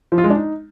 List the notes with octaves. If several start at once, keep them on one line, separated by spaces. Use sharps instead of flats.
F3
F4
G#3
D4
D#4